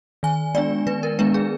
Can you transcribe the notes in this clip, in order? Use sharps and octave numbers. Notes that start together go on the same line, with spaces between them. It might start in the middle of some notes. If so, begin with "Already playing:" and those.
D#3 G#5
G#3 B3 D4 D5
D#3 B4
A#4
G#3 B3 D4 B4
G#4